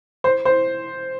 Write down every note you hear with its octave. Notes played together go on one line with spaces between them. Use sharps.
C5
C5